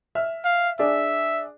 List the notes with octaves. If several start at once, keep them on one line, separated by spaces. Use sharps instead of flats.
E5 F6
F5
D4 G#4 D5 E5